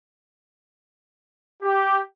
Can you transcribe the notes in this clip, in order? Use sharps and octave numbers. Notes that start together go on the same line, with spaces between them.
G4